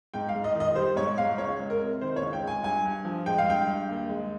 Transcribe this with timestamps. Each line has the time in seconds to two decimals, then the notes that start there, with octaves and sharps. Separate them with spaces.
0.14 G#2 G5
0.29 F5
0.35 G#2
0.44 D#5
0.55 D#3
0.60 D#5
0.75 G3 C5
0.96 G#2 C#5
1.18 G#2 F5
1.38 C#2 C#5
1.59 G#3
1.70 A#4
1.81 C3
2.01 D#3 C5
2.16 C#5
2.22 C#2
2.33 G5
2.43 G#3 G#5
2.63 G2 G#5
2.85 G2
3.05 F3
3.26 G#3 G5
3.38 F5
3.47 G2 G5
3.67 G2
3.89 D#2
4.09 G#3